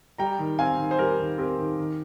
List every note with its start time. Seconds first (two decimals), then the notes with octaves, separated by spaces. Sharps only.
0.18 G3 G5 A#5
0.39 D#3
0.59 C4 F5 G#5
0.79 D#3
0.91 C5
0.98 G3 G4 A#4
1.19 D#3
1.38 C4 G4 A#4
1.59 D#3
1.79 D#3